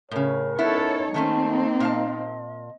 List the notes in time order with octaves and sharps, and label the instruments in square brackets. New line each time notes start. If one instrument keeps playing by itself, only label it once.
[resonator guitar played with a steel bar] A2 C#3 [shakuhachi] A#4 [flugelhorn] C#5
[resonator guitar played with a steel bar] B3 E4 [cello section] C#4 A4 C#5 [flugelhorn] D#4
[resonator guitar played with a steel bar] D#3 A3 C#4 [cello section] A#3 C4 [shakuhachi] A5
[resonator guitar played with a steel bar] A#2 F5 A5 [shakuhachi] D#5